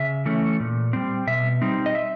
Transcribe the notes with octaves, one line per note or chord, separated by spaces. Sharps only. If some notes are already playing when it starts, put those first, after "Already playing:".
Already playing: C#3 E5
E3 A3 C#4
A#2
G3 C4
B2 E5
G3 C4 D#4
D#5
E5